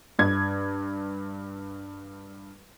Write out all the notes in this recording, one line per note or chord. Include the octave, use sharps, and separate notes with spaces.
G2 G#6